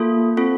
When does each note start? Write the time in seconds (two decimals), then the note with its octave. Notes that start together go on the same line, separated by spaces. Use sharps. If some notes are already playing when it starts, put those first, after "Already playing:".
Already playing: A#3 F4 A4
0.37 C4 F4 A4